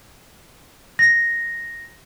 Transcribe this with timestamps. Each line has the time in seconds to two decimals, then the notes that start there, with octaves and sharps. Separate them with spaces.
0.99 A#6